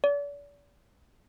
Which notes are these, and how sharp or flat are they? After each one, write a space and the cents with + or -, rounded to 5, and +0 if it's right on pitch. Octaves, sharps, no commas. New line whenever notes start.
D5 -40